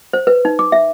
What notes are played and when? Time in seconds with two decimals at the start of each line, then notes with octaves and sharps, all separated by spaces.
0.13 C5
0.27 B4
0.45 D#4
0.59 D6
0.72 E5